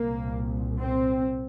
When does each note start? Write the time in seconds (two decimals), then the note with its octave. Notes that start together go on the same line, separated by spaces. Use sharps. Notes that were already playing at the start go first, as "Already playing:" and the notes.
Already playing: C2 A#2 A#3
0.80 C4